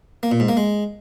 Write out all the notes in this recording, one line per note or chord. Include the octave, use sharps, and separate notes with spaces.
A#3
A#2
G#2
A#3
G#3